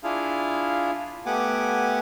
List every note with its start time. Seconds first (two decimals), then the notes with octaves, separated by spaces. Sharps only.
0.04 D4 E4 F4 G#4 F5
1.26 A3 B3 G4 F#5 G#5 D6